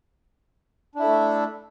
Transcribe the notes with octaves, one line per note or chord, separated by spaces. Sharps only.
A3 D4 E4 A4